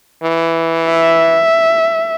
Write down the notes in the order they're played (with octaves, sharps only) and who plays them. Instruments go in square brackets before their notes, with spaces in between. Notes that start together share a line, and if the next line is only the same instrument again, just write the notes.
[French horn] E3
[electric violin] E5